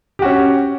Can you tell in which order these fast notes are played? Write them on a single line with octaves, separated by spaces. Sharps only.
G4 F#4 C#4